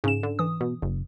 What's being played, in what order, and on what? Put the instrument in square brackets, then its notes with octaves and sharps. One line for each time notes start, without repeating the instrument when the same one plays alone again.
[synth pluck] G#2 C#4 E7 [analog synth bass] C#3
[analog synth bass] D3
[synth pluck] E3 D#6
[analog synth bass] B2
F#1